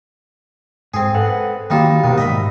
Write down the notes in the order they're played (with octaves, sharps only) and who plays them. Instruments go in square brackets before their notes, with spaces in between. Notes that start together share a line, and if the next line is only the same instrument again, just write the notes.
[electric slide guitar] G#2 [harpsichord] C4 G#4
[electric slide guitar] A4 B4 F#5
[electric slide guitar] D#3 A#3 F#4 [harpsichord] G3 D#4 F4
[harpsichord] C2 D#3 [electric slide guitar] B2
[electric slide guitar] G#2 [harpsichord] D#5 E5 B5